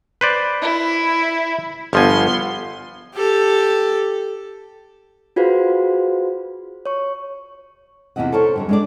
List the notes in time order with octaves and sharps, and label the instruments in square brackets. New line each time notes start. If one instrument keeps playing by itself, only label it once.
[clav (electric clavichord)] B4 C5 D5
[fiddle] E4
[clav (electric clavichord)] G1 F3 G#5 [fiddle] B3 C6
[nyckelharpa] G4 A4
[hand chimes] F4 F#4 G#4 B4 C5 F5
C#5 C#6
[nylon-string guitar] E2 C3 E3 E4 D#5 F#5
A4 A#4 C5 C#5
F#2 D3 G3
G#3 D4 D5